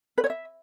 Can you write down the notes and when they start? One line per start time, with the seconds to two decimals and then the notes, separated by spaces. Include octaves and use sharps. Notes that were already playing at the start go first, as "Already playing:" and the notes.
0.18 B4
0.24 C#5
0.30 E5